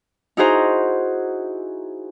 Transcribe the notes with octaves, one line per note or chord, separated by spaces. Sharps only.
D#4 E4 F#4 G#4 C5 A#5